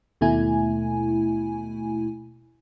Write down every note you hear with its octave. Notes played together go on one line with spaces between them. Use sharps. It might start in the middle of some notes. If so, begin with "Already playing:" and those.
D#2 B2 A3 E4 G#5